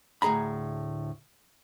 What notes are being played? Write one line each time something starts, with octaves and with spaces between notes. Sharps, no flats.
D2 A2 G#4 A#5 B5